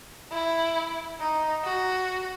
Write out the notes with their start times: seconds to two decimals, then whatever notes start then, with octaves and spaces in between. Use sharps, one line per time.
0.32 E4
1.20 D#4
1.64 F#4